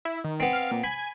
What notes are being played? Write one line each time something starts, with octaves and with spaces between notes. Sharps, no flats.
E4
D#3
B3 C4
F5
A#2
G#5 B5